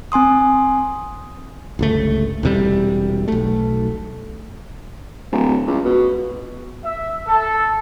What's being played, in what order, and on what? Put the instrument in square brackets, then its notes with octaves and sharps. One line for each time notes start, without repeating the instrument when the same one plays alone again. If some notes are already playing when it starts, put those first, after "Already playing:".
[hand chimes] C4 G#5 C6 D#6
[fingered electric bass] G1 C#2 A3
E1 C3 G3
B1 A3
[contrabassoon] D1
C#2
B2
[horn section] E5
A4